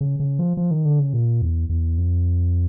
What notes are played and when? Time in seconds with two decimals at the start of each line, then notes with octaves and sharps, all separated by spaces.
0.01 C#3
0.20 C#3
0.39 F3
0.57 F3
0.71 D#3
0.85 D3
0.99 C#3
1.13 A#2
1.42 E2
1.69 E2
1.98 F2